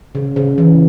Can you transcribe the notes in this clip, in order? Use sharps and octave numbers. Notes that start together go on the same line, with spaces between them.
C#3
C#3
E3